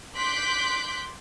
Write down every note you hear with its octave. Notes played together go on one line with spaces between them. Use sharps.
C6 D6 F#6 G6 B6